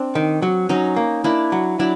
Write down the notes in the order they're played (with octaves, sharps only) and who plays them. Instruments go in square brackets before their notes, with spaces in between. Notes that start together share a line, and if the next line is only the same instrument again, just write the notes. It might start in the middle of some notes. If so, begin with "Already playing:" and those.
Already playing: [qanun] C4 D4
[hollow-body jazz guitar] D#3
F#3
[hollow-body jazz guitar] F#3 [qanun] C#4 D#4
[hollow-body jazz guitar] A#3
[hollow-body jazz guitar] A#3 [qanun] D4 E4
[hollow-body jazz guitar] F#3
[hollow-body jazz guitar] F#3 [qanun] D4 E4